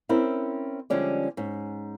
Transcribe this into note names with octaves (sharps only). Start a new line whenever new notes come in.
C4 C#4 E4 A#4
D3 F3 G3 G#3 C#4 D5
G#2 C#4